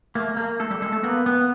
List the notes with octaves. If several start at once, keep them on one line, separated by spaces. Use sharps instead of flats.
A3 A#3
A#3
A3 A4
G3
G#3 A4
A3
A#3 B3
B3